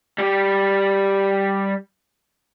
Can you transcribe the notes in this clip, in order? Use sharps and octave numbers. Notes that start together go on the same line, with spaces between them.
G3 G4